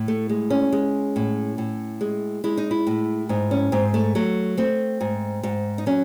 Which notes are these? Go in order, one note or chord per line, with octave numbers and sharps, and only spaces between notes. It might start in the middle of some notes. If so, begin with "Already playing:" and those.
Already playing: A2
A3
G#3
C#4
G#3
A2
A2
G#3
G#3 E4
D#4
E4
A2
G#2 D#4
C#4
G#2 C4
A3
F#3 A3
A3 C4
G#2
G#2
D#4
F#3 C#4